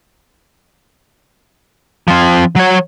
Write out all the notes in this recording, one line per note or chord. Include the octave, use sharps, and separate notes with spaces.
F3 C4
F#3 C#5